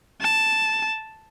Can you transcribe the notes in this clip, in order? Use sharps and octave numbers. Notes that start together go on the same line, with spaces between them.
A5